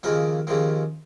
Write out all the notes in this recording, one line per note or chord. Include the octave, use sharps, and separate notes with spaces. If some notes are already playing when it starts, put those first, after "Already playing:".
D#2 C#3 F3 A#3 A#4
D#2 C#3 F3 A#3